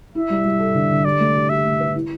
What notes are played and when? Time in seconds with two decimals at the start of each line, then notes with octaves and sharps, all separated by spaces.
0.14 E4 E5
0.30 G3
0.45 G3
0.59 A4
0.75 D3
0.90 D3
1.04 G4 D5
1.20 A3
1.34 G4
1.49 G4 E5
1.64 A3
1.80 B4
1.95 E4